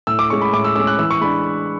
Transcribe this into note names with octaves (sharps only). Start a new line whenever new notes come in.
A2 E6
D6
G#3 C#4 C#6
B5
A2 D6
E6
G#3 C#4 E6
F#6
E3 E6
C#6
G#3 D4 B5